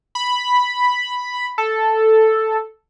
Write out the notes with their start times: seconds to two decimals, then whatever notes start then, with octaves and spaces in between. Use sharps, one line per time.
0.15 B5
1.58 A4